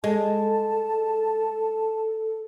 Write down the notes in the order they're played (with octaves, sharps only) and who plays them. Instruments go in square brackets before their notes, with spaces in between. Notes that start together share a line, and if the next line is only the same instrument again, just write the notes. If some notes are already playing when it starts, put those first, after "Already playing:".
[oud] G#3 [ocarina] A4 [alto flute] A5